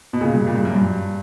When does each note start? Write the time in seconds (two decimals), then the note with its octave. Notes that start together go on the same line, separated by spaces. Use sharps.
0.13 B2
0.21 A#2 C#3
0.34 G2
0.47 A#2
0.56 G2
0.65 F#2
0.75 G2